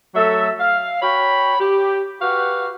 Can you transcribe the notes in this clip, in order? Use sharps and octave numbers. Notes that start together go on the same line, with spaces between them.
F#3 A3 A4 E5
F5
F#4 C#5 G5 B5
G4
F#4 G4 B4 F5 F#5